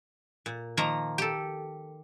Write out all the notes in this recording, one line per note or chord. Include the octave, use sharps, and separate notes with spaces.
A#2
D#3 F3 A#3 A#5
G4 A4